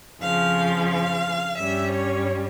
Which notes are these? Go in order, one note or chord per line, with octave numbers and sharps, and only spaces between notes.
F2 C#3 F3 F5
F5
G2 G3 C#4 E5
C#5